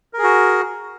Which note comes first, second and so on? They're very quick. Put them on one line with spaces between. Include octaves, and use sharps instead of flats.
A#4 G#4 F#4